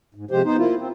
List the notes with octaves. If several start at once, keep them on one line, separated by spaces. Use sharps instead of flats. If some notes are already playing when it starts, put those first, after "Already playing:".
G#2
C3 F3 G#3 G4 C5
B3 D#4 C5
A#3 E4 F4
C4